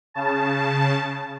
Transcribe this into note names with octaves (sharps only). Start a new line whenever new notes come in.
C#3 A5